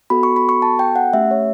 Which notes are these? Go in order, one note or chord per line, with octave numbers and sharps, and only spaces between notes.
B3 F#4 A4 B5
C#6
B5
C#6
A5
G5
F#5
A3 C#4 G4 E5
C#5